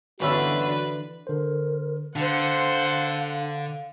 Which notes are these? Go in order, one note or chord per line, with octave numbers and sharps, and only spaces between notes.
G1 D3 E3 C#4 D4 F#4 B4 E5
D3 A#4 C5
D3 D4 C5 F5 F#5